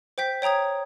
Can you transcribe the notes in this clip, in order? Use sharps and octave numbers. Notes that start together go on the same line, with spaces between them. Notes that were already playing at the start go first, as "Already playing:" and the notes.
C5 G5 G6 B6
C#5 G5 A#5 D#6 G#6